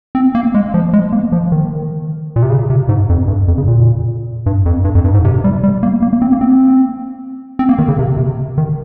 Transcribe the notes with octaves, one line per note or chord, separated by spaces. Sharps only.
C4
A#3
G#3
F3
G#3
A#3
F3
D#3
A#2
C3
C#3
C3
G#2
F2
G2
F2
C#3
A#2
G2
F2
G2
F2
G2
G#2
C3
G3
G3
A#3
A#3
A#3
C4
A#3
C4
C4
A#3
D#3
C#3
C3
C3
D#3